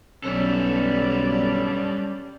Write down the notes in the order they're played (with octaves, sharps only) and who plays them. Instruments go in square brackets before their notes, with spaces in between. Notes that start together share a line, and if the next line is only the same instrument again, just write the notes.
[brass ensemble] B1 [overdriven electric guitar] G3 A4 [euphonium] C#4 [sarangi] D5